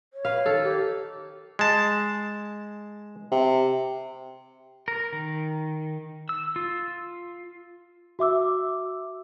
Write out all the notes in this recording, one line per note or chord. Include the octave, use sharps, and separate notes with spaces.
C#5
B4 F5
D#3 A4
G4
G#3 A5
C3
A#4
D#3
E6
F4
F#4 E5 D6 E6